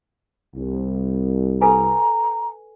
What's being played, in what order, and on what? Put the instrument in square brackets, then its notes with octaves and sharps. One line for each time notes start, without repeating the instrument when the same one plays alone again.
[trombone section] C2
[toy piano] A4 B4 G#5 [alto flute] A#5